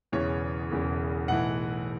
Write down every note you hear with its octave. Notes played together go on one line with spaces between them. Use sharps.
E1 E2 C#3 E3 C#5
E1 E2 C#3 E3
B1 A2 E3 F#5